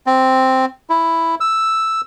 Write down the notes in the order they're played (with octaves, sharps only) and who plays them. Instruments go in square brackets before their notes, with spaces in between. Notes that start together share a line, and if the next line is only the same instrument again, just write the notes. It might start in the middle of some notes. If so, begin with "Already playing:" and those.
[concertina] C4
E4
E6